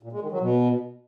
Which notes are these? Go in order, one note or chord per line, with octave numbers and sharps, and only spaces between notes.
A#2
G#3
D#3
F#3
B2